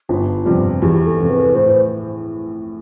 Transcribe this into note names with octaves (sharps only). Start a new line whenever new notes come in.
G1 F4
F2 C3 G3 F4
E2 G4
A4
C3 F3
B4
A2 C5